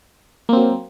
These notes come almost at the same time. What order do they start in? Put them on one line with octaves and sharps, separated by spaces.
A#3 C4 F#3